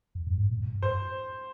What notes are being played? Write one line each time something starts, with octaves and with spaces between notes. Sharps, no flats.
F2
G2
G#2
A#2
G2
G#2
G2 C5